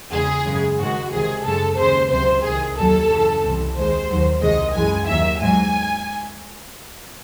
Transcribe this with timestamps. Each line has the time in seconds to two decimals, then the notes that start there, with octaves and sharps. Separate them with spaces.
0.12 E2 C#3 G#3 G#4
0.46 F#2 C#3 G#3
0.79 G#2 D#3 G#3 F#4
1.12 C#2 C3 D#3 G#4
1.44 F#2 C#3 G#3 A4
1.78 D#2 C#3 G#3 C5
2.10 C#2 C3 F#3 C5
2.43 C2 C3 D#3 G#4
2.77 D#2 D#3 F#3 A4
3.09 F#2 C#3 E3
3.43 C2 C3 E3
3.75 D#2 D#3 G#3 C5
4.09 D#2 D#3 F#3
4.41 C2 C3 D#3 G#3 D#5
4.74 F#2 E3 G#3 G#5
5.07 D#2 D#3 F#3 E5
5.40 G#2 F#3 G#5